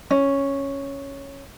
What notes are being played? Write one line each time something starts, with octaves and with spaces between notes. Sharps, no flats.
C#4